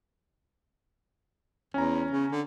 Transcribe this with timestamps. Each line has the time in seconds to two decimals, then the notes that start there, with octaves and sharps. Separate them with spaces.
1.74 E2 C#4 G#5 A#5
2.11 C#3
2.31 D3